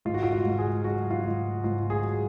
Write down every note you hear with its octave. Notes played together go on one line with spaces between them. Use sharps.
G#2 F4
F#4
F4
F#4
G#2
G#4
F#3 F#4
F4
G#2
G#2 F4
G#4
F#3